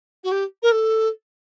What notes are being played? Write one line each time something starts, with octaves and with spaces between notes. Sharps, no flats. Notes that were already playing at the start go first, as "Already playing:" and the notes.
F#4
G4
A#4
A4